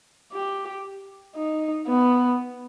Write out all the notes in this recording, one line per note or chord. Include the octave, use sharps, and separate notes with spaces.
G4
D#4
B3